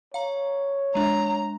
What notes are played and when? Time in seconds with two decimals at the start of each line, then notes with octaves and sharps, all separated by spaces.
0.14 C#5 F5 A#5
0.95 G#3 D4 A#5